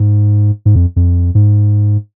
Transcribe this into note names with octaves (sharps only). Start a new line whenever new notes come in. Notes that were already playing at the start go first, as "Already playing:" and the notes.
Already playing: G#2
G#2
F2
F2
G#2